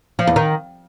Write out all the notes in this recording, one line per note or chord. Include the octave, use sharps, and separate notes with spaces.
F3
E2
D#3